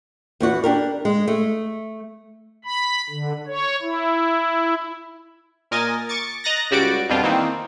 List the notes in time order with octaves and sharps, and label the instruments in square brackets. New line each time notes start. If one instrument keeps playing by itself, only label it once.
[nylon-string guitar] E2 B3 F#4
D4 G4 A#4
G#3
A3
[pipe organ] B5
D3
C#5
E4
[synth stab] A#2 A#4 D#5 G#5 A6
C#6 D6 A6 C#7
D#5 A#5 F#6 A6 A#6
C#2 G3 F#4 D5 D7
F2 B2 G3 D4 F4
D#3 E3 A#3 C4 D#4